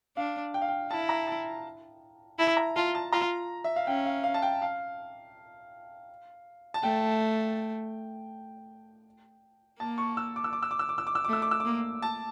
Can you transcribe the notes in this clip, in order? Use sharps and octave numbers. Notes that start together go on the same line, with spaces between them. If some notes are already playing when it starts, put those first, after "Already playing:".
D4 F5
G5
F5
G5
E4 A5
A#5
A5
E4 A5
A#5
F4 A5
A5
F4 A#5
E5
F5
C#4 G5
F5
F5
A5
G5
F5
A5
A3 G5
A#3 A5
C#6
E6
D6
E6
D6
E6
D6
E6
D6
E6
D6
E6
D6
A3 E6
D6
E6
D6
A#3
A5